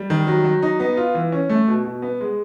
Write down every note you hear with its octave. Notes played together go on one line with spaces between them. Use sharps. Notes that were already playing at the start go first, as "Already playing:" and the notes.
Already playing: G3
D#3
F#3
F#3
D#4
B3
F4
E3
C#4
A3
B2
B2
B3
G#3